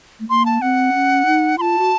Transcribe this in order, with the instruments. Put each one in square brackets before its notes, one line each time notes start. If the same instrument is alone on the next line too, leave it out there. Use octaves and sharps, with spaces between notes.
[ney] A3
[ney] A#3 [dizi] C6
[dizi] A5
[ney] C4 [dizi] F#5
[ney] C#4
D#4
[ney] F4 [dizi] A5 C6
[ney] F#4